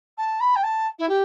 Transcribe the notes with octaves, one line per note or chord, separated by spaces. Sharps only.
A5
B5
G5
A5
E4
G4